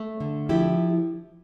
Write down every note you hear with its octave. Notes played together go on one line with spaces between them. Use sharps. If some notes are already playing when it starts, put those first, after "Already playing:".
Already playing: A3
D3
F3 E4 G4